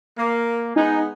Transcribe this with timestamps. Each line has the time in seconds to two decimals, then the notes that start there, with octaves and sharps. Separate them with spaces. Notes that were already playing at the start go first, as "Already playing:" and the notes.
0.18 A#3
0.76 G#3 B3 D#4 G#5